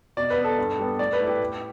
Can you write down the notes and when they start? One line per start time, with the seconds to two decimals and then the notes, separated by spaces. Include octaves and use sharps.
0.17 B2 D5
0.30 B4
0.38 B3
0.44 A4
0.58 G2
0.78 G3 B3
0.99 A2 D5
1.13 B4
1.20 A3 E4
1.26 G4
1.40 A2